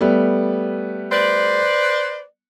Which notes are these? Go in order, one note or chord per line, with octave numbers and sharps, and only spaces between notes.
G3 A3 B3
B4 C5 D5